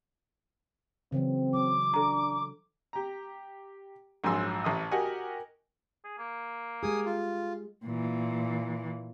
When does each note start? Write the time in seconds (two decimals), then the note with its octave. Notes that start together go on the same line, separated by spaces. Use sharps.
1.12 C#3 E3 F#3 C4
1.53 F#3 D6
1.94 D4 A4 A#5
2.93 G4 A#5
4.24 A#1 G#2 F#3 G#5 C6 E6
4.64 A1 E5 D#6
4.91 F#4 G4 A#4 D#5 F#5 G#5
6.04 G#4
6.18 A#3
6.83 G#3 G4 G#4 G#5 D#6
7.06 F4
7.84 A#2 E3